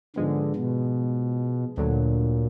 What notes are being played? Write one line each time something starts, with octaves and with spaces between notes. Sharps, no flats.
G#2 D3 F3 G#3 B3
B2
D2 A#2 D3 F#3